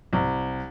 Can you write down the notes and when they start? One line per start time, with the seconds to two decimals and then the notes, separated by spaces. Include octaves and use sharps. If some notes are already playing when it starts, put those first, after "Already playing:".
0.13 C2